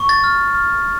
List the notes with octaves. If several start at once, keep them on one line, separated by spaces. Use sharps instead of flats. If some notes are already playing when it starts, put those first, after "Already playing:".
Already playing: C#6
A6
F6
F6